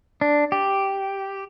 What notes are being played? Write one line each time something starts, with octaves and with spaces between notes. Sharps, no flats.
D4
G4